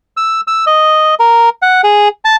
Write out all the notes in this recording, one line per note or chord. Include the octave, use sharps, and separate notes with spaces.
E6
E6
D#5
A#4
F#5
G#4
A5